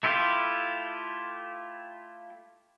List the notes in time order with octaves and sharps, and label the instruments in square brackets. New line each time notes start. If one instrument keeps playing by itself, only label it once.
[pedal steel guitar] A3 E4 F4 G4